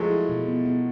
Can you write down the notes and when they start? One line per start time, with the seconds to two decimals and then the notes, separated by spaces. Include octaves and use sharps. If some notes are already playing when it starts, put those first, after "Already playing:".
Already playing: F3 F#3 G#3 A3
0.10 E4
0.29 B2
0.48 B3
0.65 B3